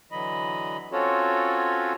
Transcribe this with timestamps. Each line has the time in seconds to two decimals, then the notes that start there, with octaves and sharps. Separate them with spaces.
0.12 D3 E3 F#3 D#5 B5
0.92 C4 C#4 F4 F#4 A4 C#5